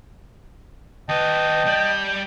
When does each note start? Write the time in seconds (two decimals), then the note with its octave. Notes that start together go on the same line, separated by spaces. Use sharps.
1.09 D#2 B4 D#5 G5 A5
1.66 G3 D5 G6